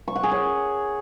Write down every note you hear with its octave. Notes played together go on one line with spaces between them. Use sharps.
C#6
F#5
G#4
C#5